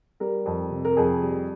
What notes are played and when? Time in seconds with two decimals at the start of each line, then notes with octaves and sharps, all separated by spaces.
0.20 G3 A#4
0.46 F2
0.71 C3
0.85 A#4
0.97 F2 G#4
1.22 G3